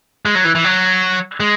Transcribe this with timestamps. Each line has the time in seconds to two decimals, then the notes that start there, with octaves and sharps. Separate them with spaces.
0.25 G#3
0.35 F#3
0.45 E3
0.55 E3
0.64 F#3
1.40 G#3